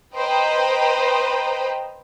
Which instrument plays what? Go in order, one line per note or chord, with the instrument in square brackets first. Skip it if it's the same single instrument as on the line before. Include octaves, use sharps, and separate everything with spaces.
[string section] B4 C5 D#5 G5 A#5 B5